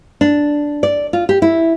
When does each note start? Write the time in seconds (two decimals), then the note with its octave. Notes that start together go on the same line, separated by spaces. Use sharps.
0.21 D4
0.83 D5
1.13 F4
1.29 G4
1.42 E4